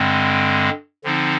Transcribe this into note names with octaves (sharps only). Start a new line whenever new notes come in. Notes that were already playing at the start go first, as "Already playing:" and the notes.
Already playing: G2 D3 G#3 C4
D3 F3 C4 D#4